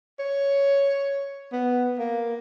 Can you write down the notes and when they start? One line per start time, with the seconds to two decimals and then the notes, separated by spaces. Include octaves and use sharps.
0.19 C#5
1.52 B3
1.99 A#3